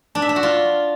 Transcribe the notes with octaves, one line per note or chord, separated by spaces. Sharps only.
D4
E5
D4
F#4
F4